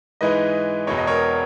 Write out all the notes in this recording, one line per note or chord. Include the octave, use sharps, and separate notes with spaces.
G#2 E3 G#3 D#4 B4 D#5
E1 E2 B2 C#5
D#5
A#4 C#5